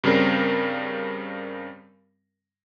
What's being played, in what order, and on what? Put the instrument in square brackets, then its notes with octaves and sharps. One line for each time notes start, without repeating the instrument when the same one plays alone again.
[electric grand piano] G2 C#3 G3 C4 A#4